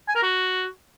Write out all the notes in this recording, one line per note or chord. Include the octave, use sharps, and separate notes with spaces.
G#5
A#4
F#4